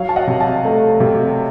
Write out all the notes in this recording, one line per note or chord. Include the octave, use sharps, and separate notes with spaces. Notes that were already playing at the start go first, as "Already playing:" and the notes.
Already playing: F#3 C#5 F5
A5
D#5 F#5
C3
F5 A5
A3
C3